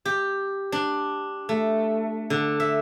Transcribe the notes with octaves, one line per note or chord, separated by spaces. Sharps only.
G4
D4
A3
D3
E5